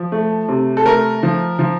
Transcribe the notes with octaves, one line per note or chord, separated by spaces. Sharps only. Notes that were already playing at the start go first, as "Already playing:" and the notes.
Already playing: F3
A3
C3
A4
A3 A#4
F3
F3